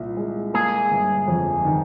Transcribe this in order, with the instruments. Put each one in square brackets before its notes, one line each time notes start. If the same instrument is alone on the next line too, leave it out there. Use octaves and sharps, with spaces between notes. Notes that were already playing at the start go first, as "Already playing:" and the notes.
Already playing: [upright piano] C2 A#2
G#3
[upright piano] A#3 [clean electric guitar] G#4
[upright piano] G1
F2
D#3